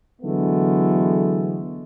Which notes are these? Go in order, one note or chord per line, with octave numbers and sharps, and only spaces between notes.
D3 E3 F#3 G#3 A3 B3